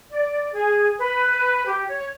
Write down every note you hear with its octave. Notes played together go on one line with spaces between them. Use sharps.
D5
G#4
B4
G4
C#5